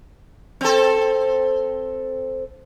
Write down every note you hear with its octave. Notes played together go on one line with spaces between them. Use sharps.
C4 A4